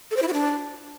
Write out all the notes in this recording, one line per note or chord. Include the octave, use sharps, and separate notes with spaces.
A4
C5
E4
F#4
D4